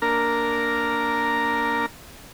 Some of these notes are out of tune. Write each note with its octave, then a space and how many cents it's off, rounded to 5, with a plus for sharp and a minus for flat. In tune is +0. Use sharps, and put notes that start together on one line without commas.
A#3 +0 D4 -5 A#4 +0